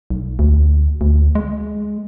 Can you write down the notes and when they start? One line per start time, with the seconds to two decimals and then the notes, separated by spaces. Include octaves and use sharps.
0.10 B1
0.39 D2
1.01 D2
1.35 G#3